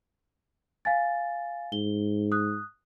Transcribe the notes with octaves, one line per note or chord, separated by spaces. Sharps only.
F5 G#5 A6
G#2 G7
D#6 F#6